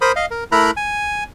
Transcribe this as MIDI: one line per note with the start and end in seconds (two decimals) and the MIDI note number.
0.01 0.12 70
0.01 0.12 72
0.01 0.12 83
0.01 0.12 87
0.16 0.26 75
0.16 0.26 77
0.31 0.44 70
0.52 0.71 57
0.52 0.71 64
0.52 0.71 70
0.52 0.71 82
0.52 0.71 83
0.52 0.71 90
0.77 1.24 80